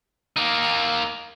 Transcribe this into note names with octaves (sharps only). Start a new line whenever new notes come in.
A#3 D#4